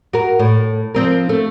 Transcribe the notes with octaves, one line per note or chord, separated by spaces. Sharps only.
F#4 A#4
A2
F3 C4 A#4
A3